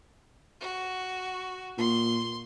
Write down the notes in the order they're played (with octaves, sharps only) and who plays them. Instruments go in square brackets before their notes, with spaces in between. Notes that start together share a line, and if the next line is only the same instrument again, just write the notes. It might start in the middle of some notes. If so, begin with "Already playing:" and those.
[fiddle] F#4
[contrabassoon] A#2 [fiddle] C6